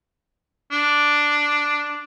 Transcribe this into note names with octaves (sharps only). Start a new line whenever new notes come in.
D4